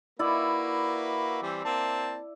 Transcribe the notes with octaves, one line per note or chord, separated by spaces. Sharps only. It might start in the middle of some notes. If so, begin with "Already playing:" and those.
A#3 E4 F#4 B4 D5 E5
E3 G3 C4
A#3 C4 A5